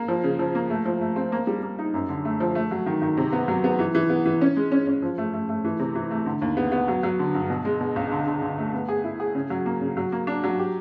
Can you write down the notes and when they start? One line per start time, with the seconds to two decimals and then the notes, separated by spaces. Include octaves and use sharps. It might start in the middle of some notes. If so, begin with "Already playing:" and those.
Already playing: A#3
0.08 F3
0.23 C#3
0.39 F3
0.55 A#3
0.70 A3
0.86 F3
1.01 A3
1.16 C4
1.32 A#3
1.47 G3
1.63 A#3
1.79 D#4
1.94 F#2
2.09 D3
2.25 A3
2.40 F3
2.55 A3
2.71 F#3
2.86 D#3
3.02 D#3
3.17 C3
3.33 B3
3.48 F#3
3.64 B3
3.79 E3
3.95 E3
4.10 B3
4.26 E3
4.41 C#4
4.56 G#3
4.72 C#4
4.87 C#4
5.02 F3
5.18 A3
5.34 A3
5.49 A3
5.64 E3
5.79 C3
5.95 E3
6.11 A3
6.26 D3
6.42 D#2
6.57 B3
6.72 B3
6.88 F#3
7.03 F#3
7.19 D3
7.34 G2
7.50 B2
7.65 G#3
7.81 B2
7.96 C#2
8.12 D3
8.27 D3
8.42 D3
8.58 A3
8.73 B3
8.89 G#4
9.04 E4
9.20 G#4
9.35 C#3
9.50 F#3
9.66 A#3
9.81 C#3
9.97 F#3
10.12 A#3
10.27 D4
10.44 F#3
10.59 G4